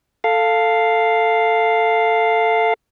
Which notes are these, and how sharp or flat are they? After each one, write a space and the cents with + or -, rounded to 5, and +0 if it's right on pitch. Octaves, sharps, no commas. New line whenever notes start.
A4 +10 F5 +0